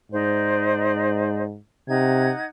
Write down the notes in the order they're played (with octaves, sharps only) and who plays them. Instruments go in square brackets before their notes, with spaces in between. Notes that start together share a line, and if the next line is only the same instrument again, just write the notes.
[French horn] G#2 [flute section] D#4 C5 D5
[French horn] C3 [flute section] D#4 F#5 G#6